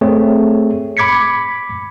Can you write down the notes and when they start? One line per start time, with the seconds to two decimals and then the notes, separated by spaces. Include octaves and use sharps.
0.01 A3 C4 G#4 C#5
0.97 B5 D6 G#6 B6 C#7